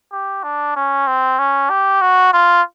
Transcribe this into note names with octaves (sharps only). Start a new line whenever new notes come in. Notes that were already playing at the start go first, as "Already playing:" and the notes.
G4
D4
C#4
C4
C#4
G4
F#4
F4